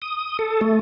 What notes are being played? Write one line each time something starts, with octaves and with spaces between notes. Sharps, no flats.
D#6
A4
A3